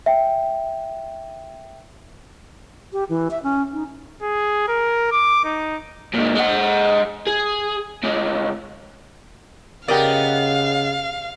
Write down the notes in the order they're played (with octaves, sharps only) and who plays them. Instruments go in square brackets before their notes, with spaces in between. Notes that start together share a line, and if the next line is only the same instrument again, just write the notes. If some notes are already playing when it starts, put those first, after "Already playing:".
[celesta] E5 G5
[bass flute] G4
E3
E5
C#4
D#4
[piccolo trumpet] G#4
A#4
D6
D#4
[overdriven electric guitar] A#2 G#3
G#3 F#5
G#4
C2 G#3
[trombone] C#3 [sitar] B3 D#5 [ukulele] G4 A#4 D5 [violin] F5